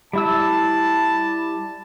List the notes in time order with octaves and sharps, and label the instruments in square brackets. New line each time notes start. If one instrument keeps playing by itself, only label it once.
[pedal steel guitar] G3 E4 E6 [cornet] A5